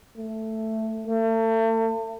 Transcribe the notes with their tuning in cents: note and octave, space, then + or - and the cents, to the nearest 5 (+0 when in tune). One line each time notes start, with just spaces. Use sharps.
A3 +5
A3 +35